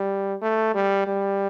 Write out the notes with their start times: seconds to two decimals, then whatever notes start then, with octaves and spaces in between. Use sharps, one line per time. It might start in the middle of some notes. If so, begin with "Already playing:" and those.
Already playing: G3
0.41 A3
0.74 G3
1.07 G3